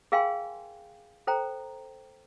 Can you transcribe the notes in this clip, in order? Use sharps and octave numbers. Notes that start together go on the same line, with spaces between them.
G#4 A#4 F5 G5 G#5 C6
A4 C5 G5 A#5